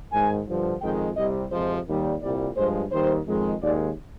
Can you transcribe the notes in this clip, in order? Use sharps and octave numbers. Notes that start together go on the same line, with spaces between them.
G#2 D#3 G#3 G#5
G2 D3 F3
F2 D#3 G#3 G5
C2 C3 G3 D#5
F2 C3 F3 G#3 C5
D#2 D#3 G3
C2 A#2 G3 D5
G2 F3 G#3 C5
D#2 D#3 G3 C5
F2 D#3 G#3
D#2 D#3 G#3 D5